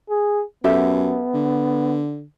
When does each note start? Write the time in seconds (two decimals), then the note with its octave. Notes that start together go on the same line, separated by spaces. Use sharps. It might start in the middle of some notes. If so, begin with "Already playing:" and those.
0.10 G#4
0.64 F#2 B3 G4 A4 E5
1.34 D3